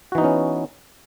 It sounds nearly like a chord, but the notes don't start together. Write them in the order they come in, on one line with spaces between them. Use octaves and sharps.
F#4 E3 D#4 B3 C#4